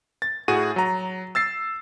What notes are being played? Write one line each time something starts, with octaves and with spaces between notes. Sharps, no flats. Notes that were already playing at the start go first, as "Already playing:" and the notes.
A6
A2 F#4 G#4 D#7
F#3 A#5
E6 A6 C7